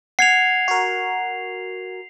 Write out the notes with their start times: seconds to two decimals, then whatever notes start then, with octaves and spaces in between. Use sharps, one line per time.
0.19 F#5 G#6 C7 F7
0.68 F#4 A#4